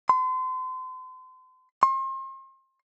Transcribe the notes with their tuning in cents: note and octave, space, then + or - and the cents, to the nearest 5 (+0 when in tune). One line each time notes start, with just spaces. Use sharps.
C6 -35
C6 +35